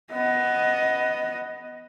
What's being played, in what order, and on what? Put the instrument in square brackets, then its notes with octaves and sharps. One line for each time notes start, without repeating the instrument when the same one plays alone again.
[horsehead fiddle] B3 D#5